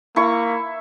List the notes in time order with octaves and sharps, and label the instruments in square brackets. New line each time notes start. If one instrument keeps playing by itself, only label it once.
[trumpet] A#3 [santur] E4 C#6